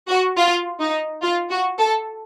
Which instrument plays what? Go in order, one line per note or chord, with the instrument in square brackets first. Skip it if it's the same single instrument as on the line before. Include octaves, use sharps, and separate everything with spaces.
[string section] F#4
F4
D#4
F4
F#4
A4